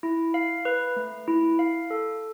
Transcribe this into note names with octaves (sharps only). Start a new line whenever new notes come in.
E4
F5
B4
A3
E4
F5
A4